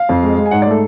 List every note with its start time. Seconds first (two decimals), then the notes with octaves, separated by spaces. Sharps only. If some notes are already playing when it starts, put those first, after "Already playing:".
Already playing: F5
0.09 F2
0.23 G#3
0.38 G#3
0.46 G#5
0.51 G#2 F#5
0.62 D5
0.66 A3 A4